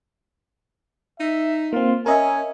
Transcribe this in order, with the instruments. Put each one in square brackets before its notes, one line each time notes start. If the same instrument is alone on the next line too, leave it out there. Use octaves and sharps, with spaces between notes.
[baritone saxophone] D#4 [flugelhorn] E5
[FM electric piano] A#3 C4 [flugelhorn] F4
[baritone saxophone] C#4 [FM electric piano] A#4 D#5 E5 [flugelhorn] G#5